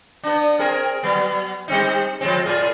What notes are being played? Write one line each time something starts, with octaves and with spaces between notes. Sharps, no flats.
B3 D4
C4 G#4 A#4
F#3 B3
G3 C4 D#4
F3 G#3 C4
A2 F4 G#4